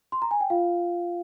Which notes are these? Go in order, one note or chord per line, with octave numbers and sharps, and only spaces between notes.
C6
A#5
G#5
G5
F4 F5